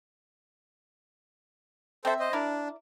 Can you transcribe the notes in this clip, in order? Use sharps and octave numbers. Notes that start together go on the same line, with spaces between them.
C4 A4 C5 E5
C5 D#5
D4 E4 A#4 D5